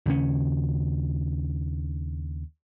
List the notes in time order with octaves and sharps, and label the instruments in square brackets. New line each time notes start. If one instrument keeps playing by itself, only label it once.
[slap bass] D#2 C#3 C#4